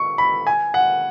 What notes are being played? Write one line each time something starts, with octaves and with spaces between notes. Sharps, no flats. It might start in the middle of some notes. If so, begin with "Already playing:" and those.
Already playing: C#6
B5
G#5
F#5